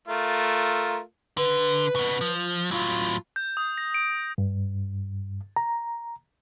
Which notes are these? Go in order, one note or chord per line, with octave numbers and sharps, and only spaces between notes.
A3 F4 A#4
D3 B4
C#3 B3
F3
A2 F#3 F4
G6
D#6
A#6
D7
G2
A#5